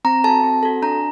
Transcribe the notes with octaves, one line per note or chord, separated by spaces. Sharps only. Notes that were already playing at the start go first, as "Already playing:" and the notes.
C4 A#5
F#4 A4 A5
C4
F#4 A4
D4 A#5